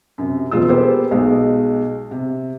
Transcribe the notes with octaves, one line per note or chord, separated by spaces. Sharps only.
F#2 C3
E1 B2 G#3 F4 E6
A#3 B3 G4 G#4 C5
B1 B2 G#3
C3